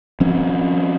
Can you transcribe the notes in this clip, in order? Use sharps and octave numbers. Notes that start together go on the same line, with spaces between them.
F3 C4 C#4